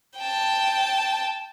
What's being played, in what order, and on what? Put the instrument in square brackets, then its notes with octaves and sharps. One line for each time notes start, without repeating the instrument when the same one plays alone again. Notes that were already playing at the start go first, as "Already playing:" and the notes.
[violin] G5 A5